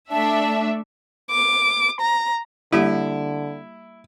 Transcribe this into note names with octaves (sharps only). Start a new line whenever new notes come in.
A3 D4 E5 A5
D6
A#5
D3 G3 A#3 E4 G4